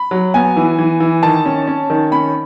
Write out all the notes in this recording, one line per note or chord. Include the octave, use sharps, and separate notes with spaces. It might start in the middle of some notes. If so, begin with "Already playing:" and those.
Already playing: B5
F#3
B3 G#5
E3
E3
E3
D#3 A5
C#4
C#4
D#3
C#4 B5